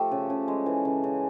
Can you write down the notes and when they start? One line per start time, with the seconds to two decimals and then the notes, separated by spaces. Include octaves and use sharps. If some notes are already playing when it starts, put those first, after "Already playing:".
Already playing: F3 A3 G4 A4
0.11 C#3
0.30 C#3
0.48 G#3
0.66 E3
0.85 C#3
1.04 C#3